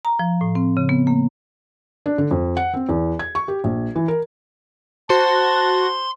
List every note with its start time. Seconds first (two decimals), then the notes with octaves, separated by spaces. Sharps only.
0.05 A#5
0.19 F3
0.41 A2
0.55 C4
0.77 C#3
0.89 B3
1.07 A#3
2.06 D4
2.18 D3
2.31 F2
2.57 F#5
2.74 C4
2.89 E2
3.19 G#6
3.35 C#6
3.48 G4
3.64 A#1
3.96 E3
4.08 A#4
5.10 F#4 C5 A5 C6